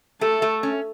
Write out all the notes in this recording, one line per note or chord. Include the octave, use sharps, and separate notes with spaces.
A3 A4
A3
C#4